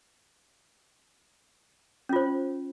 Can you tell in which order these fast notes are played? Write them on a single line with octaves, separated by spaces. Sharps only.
C#4 F4 C5